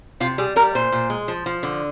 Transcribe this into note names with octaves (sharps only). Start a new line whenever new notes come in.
C3 F4
G3 G#4
G3 A#4
A#2 C5
A#2
G#3
F3
F3
D3